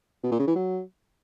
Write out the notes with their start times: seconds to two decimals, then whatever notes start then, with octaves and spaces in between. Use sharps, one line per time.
0.24 B2
0.32 A#2
0.39 C#3
0.47 E3
0.55 F#3